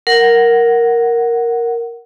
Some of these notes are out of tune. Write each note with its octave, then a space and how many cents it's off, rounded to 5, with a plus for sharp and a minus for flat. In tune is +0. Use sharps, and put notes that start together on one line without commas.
A#4 +0 F#5 +0